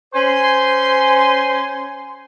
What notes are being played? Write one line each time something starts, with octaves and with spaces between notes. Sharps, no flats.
C#4 C5 G#5 C6